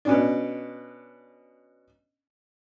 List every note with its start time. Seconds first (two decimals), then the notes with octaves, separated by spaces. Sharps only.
0.05 B2 C#4 D4